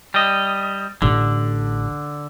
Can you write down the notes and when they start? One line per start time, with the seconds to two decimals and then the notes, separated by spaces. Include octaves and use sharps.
0.14 G3 D#5
1.02 A1 D3